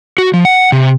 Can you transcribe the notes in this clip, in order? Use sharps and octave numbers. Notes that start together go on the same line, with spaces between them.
F#4
F3
F#5
C3